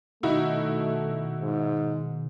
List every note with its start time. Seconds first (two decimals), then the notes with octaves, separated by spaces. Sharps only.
0.23 B2 D#3 A3 D#4 E4 F#4
1.40 G#2